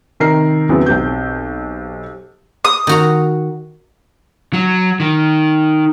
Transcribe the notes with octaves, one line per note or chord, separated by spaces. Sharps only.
C3 D#3 A#4 A#5 C7
E2 C#3 E3 F#3 B3 C4
B1 C4 G4 G6
D#6
D#3 F#4 A#5
F#3
D#3